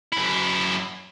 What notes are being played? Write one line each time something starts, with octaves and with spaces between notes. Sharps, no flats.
F#2 E4